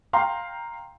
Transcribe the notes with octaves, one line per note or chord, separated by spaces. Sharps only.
F5 G5 A#5 C6